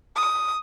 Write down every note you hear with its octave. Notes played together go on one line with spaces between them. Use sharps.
D#6